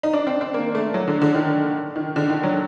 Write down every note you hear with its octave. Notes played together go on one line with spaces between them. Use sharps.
D#4
D4
C4
C4
A#3
A3
F#3
D3
D3
D#3
D#3
D3
D#3
F#3